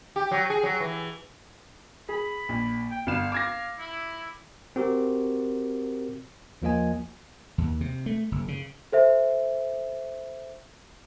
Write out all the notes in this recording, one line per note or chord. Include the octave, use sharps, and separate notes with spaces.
G4
F#3
G#4
F#3
E3
G#4 B5
A#1
G5
G1 F5 E7
F5 D6 G#6 A#6
E4
C4 F#4 G4 A#4
D#2 F3 A#3 F4 D#5 G#5
D#2
C3
A3
F#1
C#3
A4 C5 E5